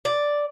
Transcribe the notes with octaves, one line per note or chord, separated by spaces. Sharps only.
D5